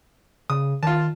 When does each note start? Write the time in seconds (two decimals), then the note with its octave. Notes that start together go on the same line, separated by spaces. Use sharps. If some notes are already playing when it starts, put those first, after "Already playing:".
0.50 C#3 D#6
0.83 D#3 F4 A5